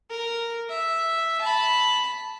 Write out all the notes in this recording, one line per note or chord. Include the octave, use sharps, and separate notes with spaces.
A#4
E5
A5 B5